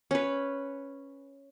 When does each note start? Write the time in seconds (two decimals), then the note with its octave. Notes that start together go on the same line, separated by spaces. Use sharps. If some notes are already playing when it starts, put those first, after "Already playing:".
0.11 C#4 B4